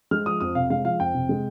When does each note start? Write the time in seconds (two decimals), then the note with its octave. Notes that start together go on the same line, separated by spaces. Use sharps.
0.11 G#3 F6
0.26 F3 D#6
0.41 F2 D#6
0.55 C3 F5
0.70 G#3 F5
0.85 F3 F5
1.00 F2 G5
1.14 C3
1.29 G#3